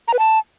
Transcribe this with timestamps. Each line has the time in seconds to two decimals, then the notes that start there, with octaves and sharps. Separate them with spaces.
0.08 A#5
0.13 B4
0.19 A5